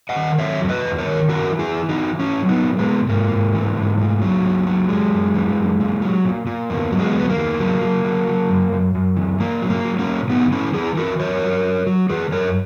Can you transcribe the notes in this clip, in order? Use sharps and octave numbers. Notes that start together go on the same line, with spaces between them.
D#5 F#5
D#3
F#3 C#5 E5
E2
B4 D#5
E2
A#4 C#5
D#3
E3 F#4 A#4
E3
E4 G#4
E3
D#4 F#4
E3
A#2 C#4 E4
F#3
B3 D#4
A#2
G#3 B3
A#2
G#2 A#3
G#2
E3
G#2
A#2
F#3
A#2
F#3
F#2 G#3
F#2
E3
F#2
A#2
F#3
A#2
A#2
E2 A#3
F#3
G#3 B3
E2 B3
A#3
E2
F#3
F#3
F#3
F#3
F#2
F#2
F#2
E3
A#2 A#3
F#3
A#3
F#3
A#3 C#4
A#2
E3 B3 D#4
E3 C#4 E4
E3 E4 G#4
E3 F#4 A#4
F#3 A#4 C#5
F#3
F#3
F#3
E3 G#4 B4
F#2 A#4 C#5